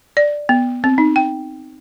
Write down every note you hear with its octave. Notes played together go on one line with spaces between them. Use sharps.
D5
B3
C4
D#4
G5